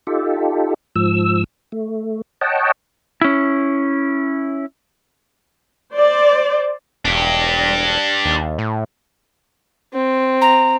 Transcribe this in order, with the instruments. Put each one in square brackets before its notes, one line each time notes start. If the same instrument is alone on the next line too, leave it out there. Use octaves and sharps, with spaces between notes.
[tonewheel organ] D#4 F4 G4 A4
G#2 F3 E6
A3
C#5 D#5 F#5 G5 A5
[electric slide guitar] C#4 E4
[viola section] C5 D5
[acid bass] E1 [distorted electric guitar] D4 G4
[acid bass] D#2
A2
[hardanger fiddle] C4
[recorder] A#5